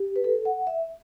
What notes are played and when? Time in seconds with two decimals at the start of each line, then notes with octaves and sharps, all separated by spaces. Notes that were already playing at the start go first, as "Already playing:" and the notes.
Already playing: G4
0.16 B4
0.24 A4
0.45 F#5
0.67 E5